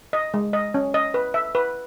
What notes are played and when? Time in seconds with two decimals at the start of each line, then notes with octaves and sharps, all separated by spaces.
0.13 D#5
0.34 G#3
0.53 D#5
0.74 C#4
0.94 D#5
1.14 B4
1.34 E5
1.55 B4